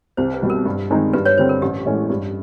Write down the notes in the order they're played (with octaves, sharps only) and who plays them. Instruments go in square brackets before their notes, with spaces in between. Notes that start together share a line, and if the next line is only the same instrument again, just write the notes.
[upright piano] C2 [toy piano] C5
[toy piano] B4
[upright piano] B2 G3
[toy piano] A#4
[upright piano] G2
D#3 G#3 C4 D#4
[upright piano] G2 [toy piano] B4
[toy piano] B4 C#5
[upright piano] D3 G3 C4 [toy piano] C5
[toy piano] A#4
[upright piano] A1 [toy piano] G4
[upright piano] A2 E3 G#3 C#4
G2